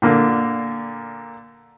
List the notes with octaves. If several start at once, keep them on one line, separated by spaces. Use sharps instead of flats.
A#2 D3 A#3